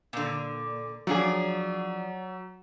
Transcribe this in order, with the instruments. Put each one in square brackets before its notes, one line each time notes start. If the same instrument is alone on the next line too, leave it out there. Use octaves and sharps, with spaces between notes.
[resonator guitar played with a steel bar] A#2 D3
[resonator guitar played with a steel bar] F3 D4 G#4 [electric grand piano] F#3